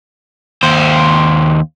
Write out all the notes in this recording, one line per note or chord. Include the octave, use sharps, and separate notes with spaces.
D#2 C5